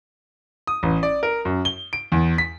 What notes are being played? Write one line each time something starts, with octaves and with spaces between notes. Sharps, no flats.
D#6
A1
D5
A#4
F#2
G7
D7
E2
B6